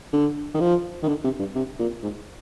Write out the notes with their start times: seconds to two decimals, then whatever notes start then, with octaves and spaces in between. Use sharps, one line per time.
0.13 D3
0.54 D#3
0.60 F3
1.03 D#3
1.08 D3
1.24 C3
1.39 G2
1.55 C3
1.79 A#2
2.03 G#2